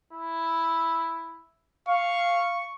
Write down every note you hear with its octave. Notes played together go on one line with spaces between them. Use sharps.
E4
F5 C#6